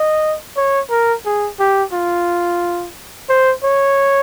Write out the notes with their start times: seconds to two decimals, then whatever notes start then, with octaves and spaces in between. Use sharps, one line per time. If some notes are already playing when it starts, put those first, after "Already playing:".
Already playing: D#5
0.57 C#5
0.91 A#4
1.26 G#4
1.60 G4
1.93 F4
3.29 C5
3.64 C#5